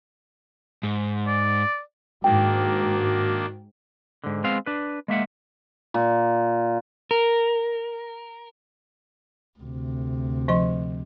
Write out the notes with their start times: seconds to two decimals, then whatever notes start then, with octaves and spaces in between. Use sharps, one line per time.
0.83 G#2
1.27 D5
2.24 G#2 D#3 A#3 D4 F#4 G5
4.24 G#2 D3
4.44 G#3 B3 C4 F5
4.66 D4 B4
5.08 G#3 A#3 E5 F#5
5.94 A#2
7.11 A#4
9.59 D2 C3
10.48 F3 D#5 C6